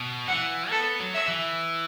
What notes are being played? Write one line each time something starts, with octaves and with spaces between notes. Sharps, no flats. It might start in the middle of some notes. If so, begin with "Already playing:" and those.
Already playing: B2
E3 F#5
B3 A4
F#3
E5
E3